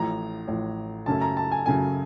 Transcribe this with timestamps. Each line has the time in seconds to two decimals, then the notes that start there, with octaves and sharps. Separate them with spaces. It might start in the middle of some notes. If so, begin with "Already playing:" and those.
Already playing: A1 A2 F3 A#5
0.48 A1 A2 F3
1.06 F#2 C#3 F#3 A3 C#4 A5
1.21 A#5
1.37 A5
1.52 G#5
1.66 F#2 C#3 F#3 A3 C#4 G#5